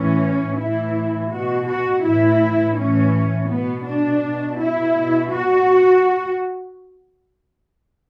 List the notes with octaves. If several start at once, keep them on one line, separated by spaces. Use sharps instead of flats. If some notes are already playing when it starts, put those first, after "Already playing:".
Already playing: A2 E3 C#4
A2 E3 E4
B2 F#4
F#4
A2 E3 E4
A2 E3 C#4
B2 B3
D4
B2
E4
B2
F#4